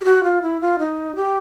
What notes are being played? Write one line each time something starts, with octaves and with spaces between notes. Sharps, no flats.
G4
F#4
F4
E4
F4
D#4
G4